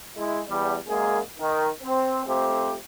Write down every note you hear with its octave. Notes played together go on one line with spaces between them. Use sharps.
G#3 E4
E2 G3
F#2 G#3 A#3 G#4
D#3
C4
F2 A3 C4 G4